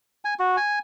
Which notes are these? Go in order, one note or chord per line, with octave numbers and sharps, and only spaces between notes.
G#5
F#4
G#5